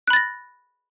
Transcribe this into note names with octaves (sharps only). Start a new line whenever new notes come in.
B5 F#6 A6 A#6